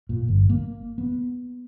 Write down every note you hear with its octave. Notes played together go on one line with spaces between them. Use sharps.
A#2
G1
A#3
B3